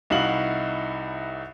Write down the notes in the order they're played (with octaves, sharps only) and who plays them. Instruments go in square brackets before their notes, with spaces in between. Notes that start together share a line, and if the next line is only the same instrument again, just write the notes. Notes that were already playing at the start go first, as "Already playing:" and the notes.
[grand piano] C2 D#4 E4 F#4 F5 F#7